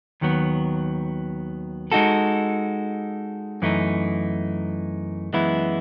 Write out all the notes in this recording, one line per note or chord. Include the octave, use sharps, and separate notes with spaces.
D#2 D#3 F#3 B3
G#3 D#4 F#4 A4
F#2 E3 A3 D#4
F#2 E3 G#3 B3 E4